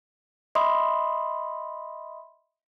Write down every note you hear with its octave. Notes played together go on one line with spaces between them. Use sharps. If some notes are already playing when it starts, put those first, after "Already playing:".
D#5 E5 B5 C6 D#6